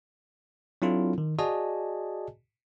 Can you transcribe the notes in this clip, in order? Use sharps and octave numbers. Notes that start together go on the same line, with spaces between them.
F#3 C4 D4 E4 F4 A4
D#3
F#4 G#4 D5 D#5 G#5 A5